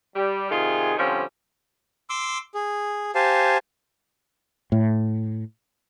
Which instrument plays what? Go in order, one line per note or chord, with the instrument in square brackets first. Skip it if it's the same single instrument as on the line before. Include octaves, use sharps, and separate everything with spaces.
[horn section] G3
C3 D#3 F4 G#4
D3 F3 G3 C4 C#4
[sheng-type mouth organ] C6 D6 E6
G#4
G4 C5 F5 G#5 A5
[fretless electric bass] A2